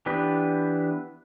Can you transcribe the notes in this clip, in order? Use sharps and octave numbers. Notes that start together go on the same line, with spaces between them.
E3 B3 D4 G4 B4